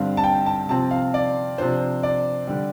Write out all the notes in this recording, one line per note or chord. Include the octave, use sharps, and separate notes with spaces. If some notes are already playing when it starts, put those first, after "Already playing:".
Already playing: G2 D3 G3 C4 F5
A5
G5
A5
C3 F3 C4 A5
F5
D5
C3 F3 D4 C5
D5
D3 G3